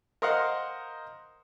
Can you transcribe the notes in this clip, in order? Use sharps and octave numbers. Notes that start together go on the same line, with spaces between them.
A#4 C5 D#5 F5 F#5